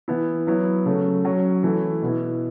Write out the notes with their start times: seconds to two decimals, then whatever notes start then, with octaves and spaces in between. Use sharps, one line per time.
0.08 E3 B3 E4
0.47 F#3 B3 E4
0.85 C#3 F#3 A3
1.25 F#3 C#4 F#4
1.63 E3 A3 E4
2.02 B2 B3 E4